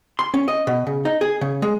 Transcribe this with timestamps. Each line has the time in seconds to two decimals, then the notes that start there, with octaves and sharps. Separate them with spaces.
0.19 C6
0.34 C#4
0.48 D#5
0.67 B2
0.87 C#3
1.05 D#4
1.21 G#4
1.41 C#3
1.62 G#3